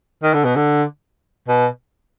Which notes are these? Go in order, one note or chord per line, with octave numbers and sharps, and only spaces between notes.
D#3
D3
B2
D3
B2